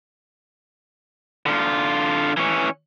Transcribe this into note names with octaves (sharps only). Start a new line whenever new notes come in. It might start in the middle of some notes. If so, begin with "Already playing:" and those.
D3 F4
E3 C#4